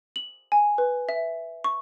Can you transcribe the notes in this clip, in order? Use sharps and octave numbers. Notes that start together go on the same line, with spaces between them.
F#7
G#5
B4
E5
C#6